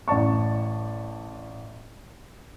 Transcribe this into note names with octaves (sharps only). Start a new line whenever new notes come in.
A1 D5 A5 C#6